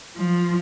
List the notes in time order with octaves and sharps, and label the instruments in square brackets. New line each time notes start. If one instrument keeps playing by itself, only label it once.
[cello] F3